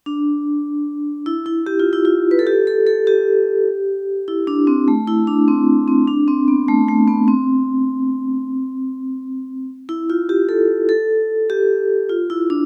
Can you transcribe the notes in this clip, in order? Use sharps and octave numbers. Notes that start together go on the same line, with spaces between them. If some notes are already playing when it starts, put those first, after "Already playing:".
D4
E4
E4
G4
F4
E4
F4
B4
A4
G4
A4
A4
G4
E4
D4
C4
A3
E4
D4
C4
C4
D4
C4
B3
A3
A3
B3
C4
E4
F4
G4
A4
A4
G4
F4
E4
D4